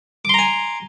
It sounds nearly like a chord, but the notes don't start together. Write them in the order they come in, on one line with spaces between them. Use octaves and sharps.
D6 C6 A#5 G#5